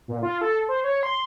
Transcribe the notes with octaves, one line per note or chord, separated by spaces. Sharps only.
A#2
F4
A4
C5
C#5
C6